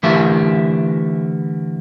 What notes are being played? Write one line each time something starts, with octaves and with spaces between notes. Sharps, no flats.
D3 E3 A3 G4 A#4 E5